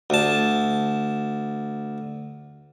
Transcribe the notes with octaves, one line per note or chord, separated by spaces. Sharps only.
D2 A5